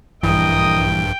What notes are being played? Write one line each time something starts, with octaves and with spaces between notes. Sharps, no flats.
A#1 G2 E3 A#4 D#5 G5 D#6